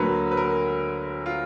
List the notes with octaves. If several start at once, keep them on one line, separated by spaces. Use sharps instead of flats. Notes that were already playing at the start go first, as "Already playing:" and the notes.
Already playing: D2 D3 F#3 A#3 B4
B4
A#4
F4